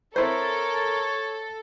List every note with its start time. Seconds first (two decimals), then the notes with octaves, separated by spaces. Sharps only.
0.16 C4 E4 A4 A#4 C5 C#5